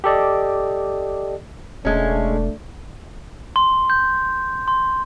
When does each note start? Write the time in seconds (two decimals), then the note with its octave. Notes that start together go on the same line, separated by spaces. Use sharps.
0.04 G4 A4 D5 D#5
1.85 E1 G#3 A3 C#4 D4
3.56 C6
3.90 G6
4.68 C6